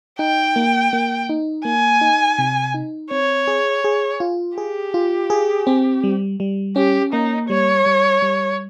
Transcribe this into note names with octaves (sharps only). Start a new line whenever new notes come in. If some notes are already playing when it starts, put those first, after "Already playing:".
D#4 G5
A#3
A#3
D#4
A#3 G#5
D#4
C3
D#4
C4 C#5
G#4
G#4
F4
G4 G#4
F4
G#4
C4
G3
G3
C#4 G4
A#3 D#4
G3 C#5
G3
G3